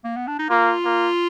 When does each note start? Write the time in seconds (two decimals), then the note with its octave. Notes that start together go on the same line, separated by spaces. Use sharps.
0.05 A#3
0.17 B3
0.27 D4
0.39 D#4
0.50 A#3 F4
0.85 A#3